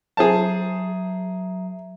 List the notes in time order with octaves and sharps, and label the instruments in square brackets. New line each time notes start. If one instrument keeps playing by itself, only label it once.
[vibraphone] F#3 E5 A#5 [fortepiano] G#4 C5 A5